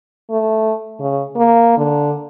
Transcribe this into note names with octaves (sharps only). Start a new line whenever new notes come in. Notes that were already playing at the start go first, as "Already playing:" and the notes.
A3
C#3
A#3
D3